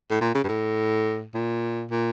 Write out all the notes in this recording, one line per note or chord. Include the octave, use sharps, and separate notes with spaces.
A2
A#2
C#3
G2
A2
A#2
A#2